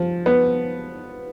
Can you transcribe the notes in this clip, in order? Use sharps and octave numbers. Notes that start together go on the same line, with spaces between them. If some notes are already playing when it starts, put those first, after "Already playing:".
Already playing: F3
B3